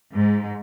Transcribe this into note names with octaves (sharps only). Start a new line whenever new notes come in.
G#2